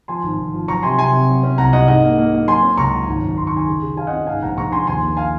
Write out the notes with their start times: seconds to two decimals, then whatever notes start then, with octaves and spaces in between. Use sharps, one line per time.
0.08 F3 G#5 C6
0.23 G#1
0.39 G#1
0.54 F3
0.68 F#3 A#5 C#6
0.83 C3 G#5 C6
0.98 C3 G#5 C6
1.13 C3
1.29 F#3
1.43 C#4
1.58 C2 F#5 A#5
1.73 C2 D#5 F#5
1.88 G#2 D#5 F#5
2.03 A#3
2.18 A#3
2.33 A#3
2.47 F#3 G#5 C6
2.63 C#4
2.78 C#2 A#5 C#6
2.92 F#3
3.07 G#1
3.22 F#2
3.38 G#1 C6
3.47 C#6
3.53 D#3 G#5 C6
3.68 C#3
3.82 C#3
3.97 C#3 F5 G#5
4.07 D#5 F#5
4.12 C#4
4.27 G#2 F5 G#5
4.42 A#1 F#5 A#5
4.57 A#1 A#5 C#6
4.72 A#1 G#5 C6
4.87 D#2 G#5 C6
5.02 A#3
5.17 F5 G#5